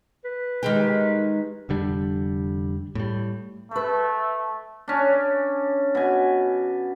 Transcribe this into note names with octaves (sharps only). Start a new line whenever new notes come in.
B4
D#3 G#3 G4
F1 D3 G3 D4
A2 G3
A3 B4 E5
C#4 D4
B2 G#5